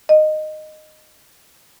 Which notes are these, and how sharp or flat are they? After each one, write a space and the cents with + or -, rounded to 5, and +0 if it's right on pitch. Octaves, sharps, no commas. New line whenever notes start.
D#5 -15